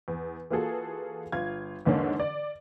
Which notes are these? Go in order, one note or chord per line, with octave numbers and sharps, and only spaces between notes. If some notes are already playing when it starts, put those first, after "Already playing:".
E2
E3 A#3 F4 F#4 G#4 A4
G1 F4 G#6
E2 G#2 D3 A#3 C#4 D4
D5